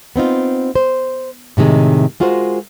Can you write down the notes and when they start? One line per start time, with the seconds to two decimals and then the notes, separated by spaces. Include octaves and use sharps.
0.16 B3 C4 D#4 F4
0.75 C5
1.57 A2 C3 D#3 G#3
2.20 G#3 F4 F#4 A#4 C5